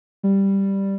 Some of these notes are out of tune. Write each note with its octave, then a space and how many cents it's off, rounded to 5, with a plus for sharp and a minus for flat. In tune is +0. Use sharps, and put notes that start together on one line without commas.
G3 +0